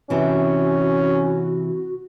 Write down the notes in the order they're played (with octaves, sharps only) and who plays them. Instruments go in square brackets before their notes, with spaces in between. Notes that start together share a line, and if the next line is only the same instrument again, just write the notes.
[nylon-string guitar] C3 E3 [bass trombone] C#4 [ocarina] F#4